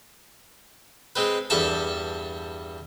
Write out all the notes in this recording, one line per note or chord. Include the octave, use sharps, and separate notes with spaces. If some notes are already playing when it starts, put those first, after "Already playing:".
G#3 C4 B4
E2 G2 G3 A4 E5 A5